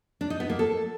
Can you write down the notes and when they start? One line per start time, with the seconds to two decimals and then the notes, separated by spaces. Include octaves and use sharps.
0.21 D4
0.30 D#4
0.40 B3
0.50 A#3
0.59 A4